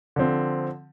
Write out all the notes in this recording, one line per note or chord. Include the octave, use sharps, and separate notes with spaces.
D3 F3 C4